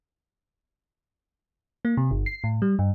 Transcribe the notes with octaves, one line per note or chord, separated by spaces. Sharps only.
A#3
C3
G1
C7
A2
G3
G2